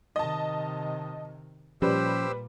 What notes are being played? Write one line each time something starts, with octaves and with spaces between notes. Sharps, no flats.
C3 D#3 D#5 A5
A#2 F3 G3 C#4 G4 B4 C5 E6